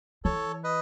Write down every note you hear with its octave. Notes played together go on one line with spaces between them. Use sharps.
E3 A4 C#5
B4 D#5